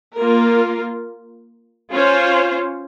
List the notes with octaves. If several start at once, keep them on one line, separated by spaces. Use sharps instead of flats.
A#3 F4 A#4
C#4 F4 C5